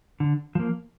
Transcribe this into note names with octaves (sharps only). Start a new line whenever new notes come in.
D3
F3 A#3